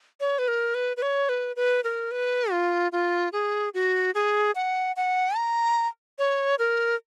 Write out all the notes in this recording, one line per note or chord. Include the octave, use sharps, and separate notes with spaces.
C#5
B4
A#4
B4
B4
C#5
B4
B4
A#4
B4
F4
F4
G#4
F#4
G#4
F#5
F#5
A#5
C#5
A#4